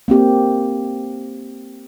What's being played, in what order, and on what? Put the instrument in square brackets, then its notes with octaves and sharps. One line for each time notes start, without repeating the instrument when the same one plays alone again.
[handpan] A#3 C4 G4